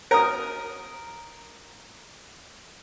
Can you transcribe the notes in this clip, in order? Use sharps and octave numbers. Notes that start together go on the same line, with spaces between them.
A#4 D#6